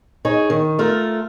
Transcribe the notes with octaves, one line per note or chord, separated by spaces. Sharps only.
D#4 G#4 C#5
D#3
A3 F4 A#4